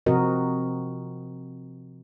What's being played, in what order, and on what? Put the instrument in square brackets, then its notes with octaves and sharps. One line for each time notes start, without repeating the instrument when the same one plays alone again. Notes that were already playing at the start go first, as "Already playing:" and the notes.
[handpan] C3 F3 C4 F#4 A#4 D#5